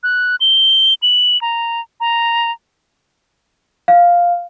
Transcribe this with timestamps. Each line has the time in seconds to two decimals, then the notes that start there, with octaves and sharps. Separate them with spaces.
0.03 F#6
0.41 G7
1.02 F#7
1.42 A#5
2.00 A#5
3.88 F5